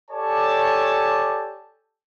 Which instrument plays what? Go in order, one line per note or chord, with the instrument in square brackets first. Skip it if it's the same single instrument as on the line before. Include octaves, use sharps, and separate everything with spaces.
[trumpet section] G4 A4 C#5 D5 G#5 A5